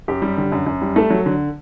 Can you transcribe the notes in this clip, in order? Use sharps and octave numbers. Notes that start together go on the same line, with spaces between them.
F#2 G4
G3
D3
F#2
F#2
G3
A3 A4
F#3
D3